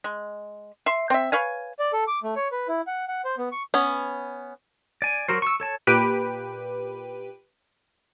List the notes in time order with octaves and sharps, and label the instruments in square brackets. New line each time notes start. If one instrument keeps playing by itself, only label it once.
[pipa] G#3
E5 C6
C4 E5
B4 C#5 F5 G#5
[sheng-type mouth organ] D5
A4
D6
A3
C#5
B4
E4
F#5
F#5
C5
B3
C#6
[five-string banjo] B3 C#4
[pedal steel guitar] D5 G#5
F#3 F#4 A#4 C5
C#6 E6
A4 C#5 A5
[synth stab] A#2 G4 B4 D7 D#7